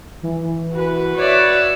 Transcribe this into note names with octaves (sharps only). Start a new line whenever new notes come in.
E3
F#4 B4
C#5 D5 E5 F#6